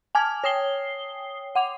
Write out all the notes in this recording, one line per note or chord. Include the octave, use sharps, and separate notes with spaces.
G#5 A5 D6 F6 G#6
C#5 G5 D#6 C7 G7
F#5 D6 F7